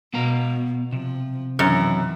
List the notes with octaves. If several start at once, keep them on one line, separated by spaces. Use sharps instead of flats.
B2 B3 F5 A#5
C3 F3
F#2 D#3 E3